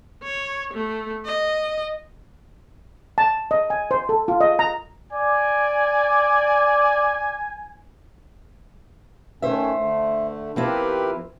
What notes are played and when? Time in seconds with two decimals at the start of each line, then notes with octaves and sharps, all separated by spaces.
0.23 C#5
0.73 A3
1.25 D#5
3.18 A5
3.51 D#5
3.70 G#5
3.91 C5
4.09 A4
4.28 F4
4.41 D#5
4.59 A#5
5.13 D5 G#5
9.42 D#3 A3 C#4 C5 E5
9.76 D3 A3
10.56 F3 C4 E4 G4 A#4 B4